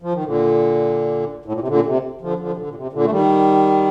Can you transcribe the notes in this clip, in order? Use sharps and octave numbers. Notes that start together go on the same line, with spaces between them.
F3
D#3
A#2 D3
A2
A#2
C3
A#2 D3
C3
D3 F3
D3 F3
C3
A#2 D3
A#2
C3
A#2 D3
A3
D#3 G3